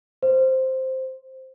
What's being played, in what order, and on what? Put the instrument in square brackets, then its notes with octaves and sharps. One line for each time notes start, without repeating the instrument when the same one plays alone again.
[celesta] C5